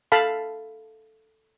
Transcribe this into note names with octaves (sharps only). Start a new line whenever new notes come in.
A4 F5 A5 B5